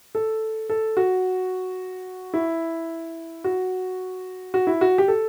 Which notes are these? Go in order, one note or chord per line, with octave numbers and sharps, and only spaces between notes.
A4
A4
F#4
E4
F#4
F#4
E4
F#4
G4
A4